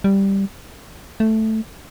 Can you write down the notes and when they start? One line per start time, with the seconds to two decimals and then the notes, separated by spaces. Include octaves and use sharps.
0.04 G3
1.20 A3